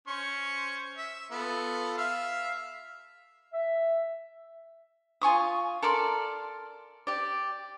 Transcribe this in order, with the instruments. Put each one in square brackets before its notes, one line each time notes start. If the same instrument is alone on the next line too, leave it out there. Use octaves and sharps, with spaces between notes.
[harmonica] C#4 C5 C#6
E5
B3 F4 A4
E5 F5
[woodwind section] E5
[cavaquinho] F4 G#5 C#6 D#6
A4 A#4 D5 C6
G4 D5